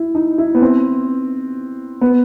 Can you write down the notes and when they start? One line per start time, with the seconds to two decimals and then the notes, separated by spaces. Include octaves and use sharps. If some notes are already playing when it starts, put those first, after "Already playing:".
Already playing: E4
0.15 D#4
0.38 E4
0.55 B3
0.62 C4
2.01 B3